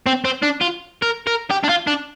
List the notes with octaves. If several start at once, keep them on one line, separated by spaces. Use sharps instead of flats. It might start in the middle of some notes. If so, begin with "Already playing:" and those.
C4
C4
D4
F4
A#4
A#4
G4
D4
F4
D4